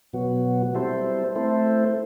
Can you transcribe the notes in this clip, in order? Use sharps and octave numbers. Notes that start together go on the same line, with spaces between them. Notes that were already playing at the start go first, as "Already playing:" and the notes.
B2 F#3 B3 F#4
G3 C4 E4 A4 C5
A3 C4 E4 A4 C5